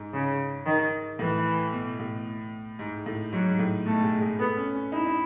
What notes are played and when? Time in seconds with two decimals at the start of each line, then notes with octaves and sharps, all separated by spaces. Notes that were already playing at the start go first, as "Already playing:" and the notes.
Already playing: G#2
0.13 C#3
0.65 D#3
1.19 A2 E3
1.73 B2
1.99 A2
2.79 G#2
3.06 A2
3.32 G#2 F#3
3.48 G#2
3.59 A2
3.86 B2 A3
4.04 G#3
4.21 G#3
4.39 A3 B3
4.57 C#4
4.75 C#4
4.92 D#4 E4
5.06 D#4